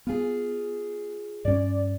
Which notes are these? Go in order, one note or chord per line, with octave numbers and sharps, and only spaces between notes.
B3 F4 G#4
G2 C#4 D5